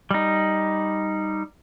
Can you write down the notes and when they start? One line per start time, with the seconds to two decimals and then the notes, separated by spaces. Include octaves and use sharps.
0.11 G3 D#4